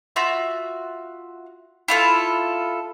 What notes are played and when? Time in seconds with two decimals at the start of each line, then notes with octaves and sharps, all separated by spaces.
0.16 F4 F#4 E5
1.88 E4 F4 A4